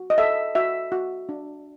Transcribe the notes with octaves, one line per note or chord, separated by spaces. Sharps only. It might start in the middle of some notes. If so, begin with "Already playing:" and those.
Already playing: F#4
D#5
A4 E5
F#4 E5
F#4
D4